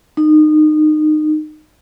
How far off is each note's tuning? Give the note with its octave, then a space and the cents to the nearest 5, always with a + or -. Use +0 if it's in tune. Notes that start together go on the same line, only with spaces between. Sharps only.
D#4 -25